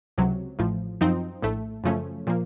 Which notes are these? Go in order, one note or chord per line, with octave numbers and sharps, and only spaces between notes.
C#2 C3 F#3
A1 A2 F3
F#2 F3 C4 D#4
A#1 A2 A3
F#2 C#3 F3 A3 C#4
A#2 F3 A#3